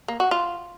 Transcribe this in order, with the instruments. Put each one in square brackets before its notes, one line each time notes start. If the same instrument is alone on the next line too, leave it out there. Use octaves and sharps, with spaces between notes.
[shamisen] A#3
F#4
F4